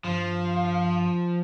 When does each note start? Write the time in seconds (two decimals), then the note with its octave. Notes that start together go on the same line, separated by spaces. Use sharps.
0.04 G2 F3 F5